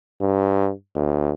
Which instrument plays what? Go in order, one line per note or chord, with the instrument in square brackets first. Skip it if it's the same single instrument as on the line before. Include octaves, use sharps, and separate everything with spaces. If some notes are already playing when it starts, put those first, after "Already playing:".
[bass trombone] G2
D2